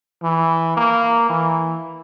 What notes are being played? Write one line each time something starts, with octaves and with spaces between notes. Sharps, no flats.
E3
A#3
E3